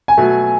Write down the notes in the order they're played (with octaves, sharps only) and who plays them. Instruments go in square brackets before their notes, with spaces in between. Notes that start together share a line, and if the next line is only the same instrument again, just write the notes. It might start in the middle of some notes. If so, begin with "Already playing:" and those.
[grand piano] G#5
[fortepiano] B2 F#3 A3